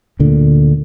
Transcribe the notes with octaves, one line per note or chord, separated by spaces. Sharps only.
D2 A#2 D3